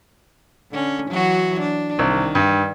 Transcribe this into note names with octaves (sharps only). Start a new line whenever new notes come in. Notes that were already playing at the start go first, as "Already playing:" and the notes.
D3 C#4
E3 F#3 F#4
D4
C2 D#3
G2